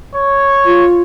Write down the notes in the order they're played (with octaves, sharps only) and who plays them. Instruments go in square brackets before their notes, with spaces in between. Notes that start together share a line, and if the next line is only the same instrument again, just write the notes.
[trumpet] C#5
[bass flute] F4